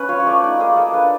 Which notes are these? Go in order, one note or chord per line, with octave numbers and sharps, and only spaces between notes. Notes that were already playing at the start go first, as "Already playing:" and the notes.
Already playing: C#4 B4
F4 C#5
C#5
A3 D5
D#4 D5
A#3 G#4
A#3 A4
D4 B4